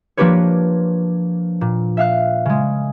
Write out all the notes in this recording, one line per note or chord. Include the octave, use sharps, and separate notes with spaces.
F3 A#3 D4 G4 B4 C#5
A#2
E5 F5 F#6
C#3 G#3